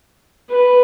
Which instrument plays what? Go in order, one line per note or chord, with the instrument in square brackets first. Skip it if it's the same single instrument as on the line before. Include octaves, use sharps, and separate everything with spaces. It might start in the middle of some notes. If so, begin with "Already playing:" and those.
[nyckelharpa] B4